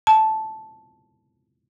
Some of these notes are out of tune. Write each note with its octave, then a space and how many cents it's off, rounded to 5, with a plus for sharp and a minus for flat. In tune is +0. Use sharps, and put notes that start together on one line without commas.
A5 -10